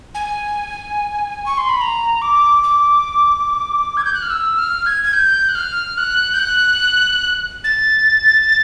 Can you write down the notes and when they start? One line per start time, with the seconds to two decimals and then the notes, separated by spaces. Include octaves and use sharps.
0.15 G#5
1.46 C#6
1.58 C6
1.69 B5
1.81 A#5
2.22 D6
2.64 D6
3.97 G#6
4.05 G6
4.14 F#6
4.22 F6
4.30 E6
4.58 F6
4.86 G#6
5.04 G#6
5.13 G6
5.49 F#6
5.55 F6
5.98 F#6
6.34 G6
6.39 F#6
7.64 A6